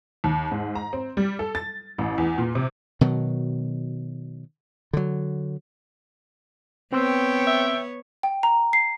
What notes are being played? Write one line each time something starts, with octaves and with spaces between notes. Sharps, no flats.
D#2
G#2
A#5
C4
G3
A4
A6
A1
E2
A#2
C3
B2 D#3 F#3
D3 F#3
B3 C4 C#5 G5 C6 E6
E5
G5
A#5
C7